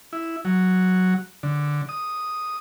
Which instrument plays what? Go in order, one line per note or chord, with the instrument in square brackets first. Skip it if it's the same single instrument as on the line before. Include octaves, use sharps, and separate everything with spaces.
[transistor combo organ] E4
F#3
D3
D#6